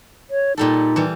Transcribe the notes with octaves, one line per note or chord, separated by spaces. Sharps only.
C#5
A#2 G3 D#4 A4
E3 G3